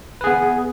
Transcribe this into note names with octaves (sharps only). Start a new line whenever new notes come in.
B3 G#4 B4